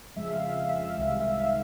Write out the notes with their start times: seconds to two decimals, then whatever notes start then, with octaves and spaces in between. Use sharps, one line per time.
0.16 F2 C#3 F3 G#3 E5
0.29 F5
0.42 E5
0.56 F5
0.69 E5
0.81 F5
0.95 C2 C3 D#3 G#3 E5
1.07 F5
1.20 E5
1.34 F5
1.47 E5